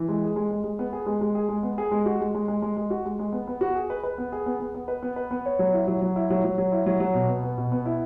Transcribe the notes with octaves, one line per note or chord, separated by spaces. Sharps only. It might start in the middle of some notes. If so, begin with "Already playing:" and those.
Already playing: E3
G#3
G#4
G#3
G#3
G#3
B3
G#4
G#3
G#3
G#4
G#3
B3
G#4
G#3
F#4
G#3
G#3
G#3
G#3
G#3
F#4
G#3
G#3
B3
B3
F#4
G#4
B4
B4
B3
G#4
B3
B3
B3
B4
B3
B4
B3
C#5
F#3
E4
F#3
F#3
E4
F#3
F#3
F#3
E4
F#3
F#3
B2
B3
B3
B2
B3
E4